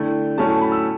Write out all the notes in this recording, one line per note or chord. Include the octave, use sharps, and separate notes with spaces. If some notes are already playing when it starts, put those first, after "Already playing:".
Already playing: D3 A3 E4 G5
A2 F#3 A3 C#4 E4 A5
A5
B5
E6